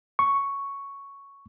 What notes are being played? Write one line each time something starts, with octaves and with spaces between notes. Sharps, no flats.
C#6